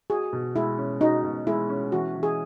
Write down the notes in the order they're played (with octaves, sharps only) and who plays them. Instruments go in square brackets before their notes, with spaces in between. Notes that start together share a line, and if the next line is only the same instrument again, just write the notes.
[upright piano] F#4 [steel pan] G#4
[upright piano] B2
[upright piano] G#3 [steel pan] E4
[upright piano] C#4
[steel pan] D#4 [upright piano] F#4
[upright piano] B2
[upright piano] G#3 [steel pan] E4
[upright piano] C#4
[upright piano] E3 [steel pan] F#4
[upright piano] E3
[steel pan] G#4